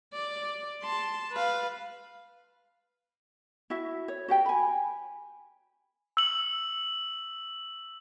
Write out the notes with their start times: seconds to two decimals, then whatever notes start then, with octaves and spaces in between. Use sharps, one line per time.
0.14 D5
0.83 A5 C6
1.32 B4 F5
3.70 E4 F#4 E5
4.08 C#5
4.28 F#4 G4 G5
4.46 G#5 B5
6.17 E6 F#7